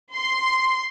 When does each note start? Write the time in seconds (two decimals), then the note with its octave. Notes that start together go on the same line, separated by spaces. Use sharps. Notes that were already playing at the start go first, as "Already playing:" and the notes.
0.14 C6